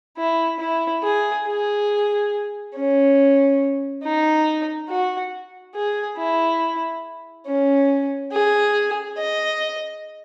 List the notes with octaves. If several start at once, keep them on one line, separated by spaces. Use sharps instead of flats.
E4
E4
G#4
G#4
C#4
D#4
F#4
G#4
E4
C#4
G#4
D#5